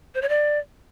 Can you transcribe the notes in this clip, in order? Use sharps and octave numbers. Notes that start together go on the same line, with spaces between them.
C5
C#5
D5